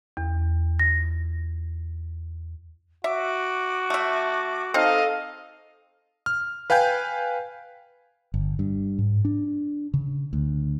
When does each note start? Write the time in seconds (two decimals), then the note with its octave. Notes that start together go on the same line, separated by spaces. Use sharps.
0.17 E2
0.79 A#6
3.04 F#4 E5 D6
3.90 A3 E5
4.74 C4 D#4 A4 D#5 F5
6.26 F6
6.70 B4 F5 G5 G#5 G6
8.34 G1
8.59 G2
8.99 G#2
9.25 D4
9.94 C#3
10.33 D2